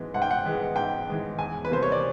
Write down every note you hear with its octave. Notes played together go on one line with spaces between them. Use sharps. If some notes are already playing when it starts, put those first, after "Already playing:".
Already playing: G#2 E3 G#3 B3
G#2 F#5
G5
F#5
E3 G#3 B3
G#2 G5
E3 G#3 B3
E2 G#5
B4
C3 E3 G3 A#3 C5
C#5
D5